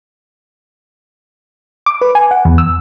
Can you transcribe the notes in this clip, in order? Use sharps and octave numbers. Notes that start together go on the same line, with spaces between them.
D6
B4
G#5
F#5
E2
E6